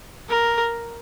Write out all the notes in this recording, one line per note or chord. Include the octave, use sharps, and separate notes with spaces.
A#4